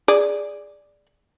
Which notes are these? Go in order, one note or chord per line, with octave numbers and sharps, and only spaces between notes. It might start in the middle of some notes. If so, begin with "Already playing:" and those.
G#4 D5